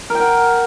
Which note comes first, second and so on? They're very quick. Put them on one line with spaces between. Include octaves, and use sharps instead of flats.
A#4 G5 F#5